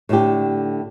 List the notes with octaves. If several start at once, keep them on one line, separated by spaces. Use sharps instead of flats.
A2 D3 D4 G4